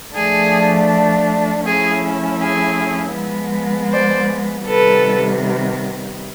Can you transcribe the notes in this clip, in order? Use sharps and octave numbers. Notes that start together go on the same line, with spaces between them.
F3 A3 D4 G#4
F3 A3 C#4 E4 G#4
G#4
F3 G#3 B3
C5 D5
C3 D#3 G3 B3 A4 B4